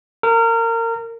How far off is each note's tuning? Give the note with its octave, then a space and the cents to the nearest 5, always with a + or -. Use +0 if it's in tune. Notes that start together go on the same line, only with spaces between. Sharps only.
A#4 -25